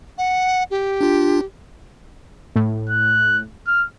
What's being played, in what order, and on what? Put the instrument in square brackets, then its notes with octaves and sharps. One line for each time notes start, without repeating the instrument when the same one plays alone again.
[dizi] F#5
G4
[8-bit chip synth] D4 F4
[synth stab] A2
[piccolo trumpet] F#6
F6